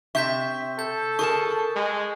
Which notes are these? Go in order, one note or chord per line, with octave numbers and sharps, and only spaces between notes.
C3 C4 E5 C#6 G6 B6
A4 G6
G#4 A#4 A5 C#6
G#3